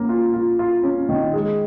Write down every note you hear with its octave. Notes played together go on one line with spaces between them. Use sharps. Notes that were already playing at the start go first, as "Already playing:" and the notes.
Already playing: A#3 C#4
F4
F4
F4
C#4
D#3
G#3